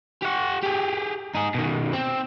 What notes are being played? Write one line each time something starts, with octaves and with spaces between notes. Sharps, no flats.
G4 F#5
G4 G#4
D#4 G#4
B2 D#3
C4